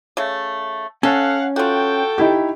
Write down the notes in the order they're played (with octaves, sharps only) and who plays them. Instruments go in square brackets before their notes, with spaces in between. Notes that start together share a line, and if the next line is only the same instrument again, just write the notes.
[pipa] C#3 A3
[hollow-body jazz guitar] C#4 [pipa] A4 [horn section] F5 F#5
[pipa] F4 F#4 [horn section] A4 G5
[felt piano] D#4 E4 G4